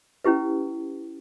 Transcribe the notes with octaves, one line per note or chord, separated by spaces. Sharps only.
C#4 E4 G4 B4